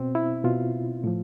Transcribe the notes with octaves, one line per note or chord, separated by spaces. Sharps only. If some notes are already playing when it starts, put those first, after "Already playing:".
Already playing: B2 C4
E4
B2 F4
A2 F3